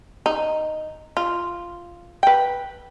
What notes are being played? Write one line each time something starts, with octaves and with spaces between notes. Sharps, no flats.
D#4
F4
B4 G5